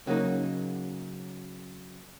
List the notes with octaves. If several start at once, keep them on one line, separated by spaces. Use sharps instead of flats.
C#3 F#3 A#3 D#4